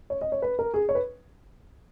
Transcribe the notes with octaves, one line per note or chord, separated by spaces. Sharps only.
C#5
D#5
C#5
B4
A#4
G#4
C#5
B4